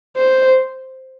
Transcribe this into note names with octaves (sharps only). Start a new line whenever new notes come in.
C5